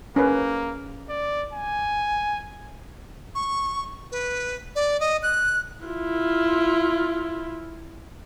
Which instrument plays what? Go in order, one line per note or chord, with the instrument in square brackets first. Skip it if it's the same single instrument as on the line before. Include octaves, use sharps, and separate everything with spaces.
[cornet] A#3 [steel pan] C#4 A#4 B4
[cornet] D5
G#5
[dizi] C#6
B4
D5
D#5
F#6
[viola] E4 F4